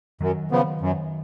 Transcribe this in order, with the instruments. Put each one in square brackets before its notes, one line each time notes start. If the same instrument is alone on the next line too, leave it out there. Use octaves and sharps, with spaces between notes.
[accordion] F#2 [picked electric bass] D#3 F#3
[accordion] C#3 F3 B3
F#2